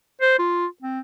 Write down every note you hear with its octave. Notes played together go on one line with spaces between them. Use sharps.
C5
F4
C4